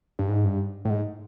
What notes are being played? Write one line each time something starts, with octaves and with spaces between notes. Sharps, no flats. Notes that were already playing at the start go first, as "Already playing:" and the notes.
G2
G#2
G2
A2
G#2